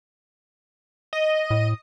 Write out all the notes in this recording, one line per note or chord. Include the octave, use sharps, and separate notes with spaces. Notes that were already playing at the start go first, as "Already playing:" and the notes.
D#5
A2